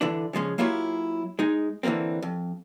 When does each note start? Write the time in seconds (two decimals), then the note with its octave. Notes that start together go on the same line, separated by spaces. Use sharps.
0.01 D3 E3 D4
0.33 C#3 F3 G#3 C#4
0.58 F#3 A#3 E4 F4 G4 C#5
1.39 G#3 D#4
1.83 D3 E3 G3 A#3 C4
2.22 F2